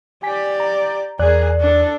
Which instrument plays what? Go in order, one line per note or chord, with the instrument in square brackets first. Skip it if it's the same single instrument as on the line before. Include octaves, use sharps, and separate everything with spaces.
[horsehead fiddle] G4 D5 [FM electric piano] G#5 B6
[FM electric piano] A#5
[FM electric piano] E2 D5 F#6 [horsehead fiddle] G#4 A#4
[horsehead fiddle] D4 A4